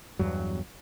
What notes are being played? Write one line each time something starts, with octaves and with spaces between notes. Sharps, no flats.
E2 G2 F#3